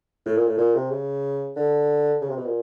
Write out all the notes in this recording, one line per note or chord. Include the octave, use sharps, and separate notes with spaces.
A2
A#2
A2
A#2
C3
C#3
D3
C#3
C3
B2
A#2